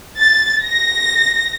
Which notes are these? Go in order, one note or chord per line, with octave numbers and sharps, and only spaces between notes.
A6
A#6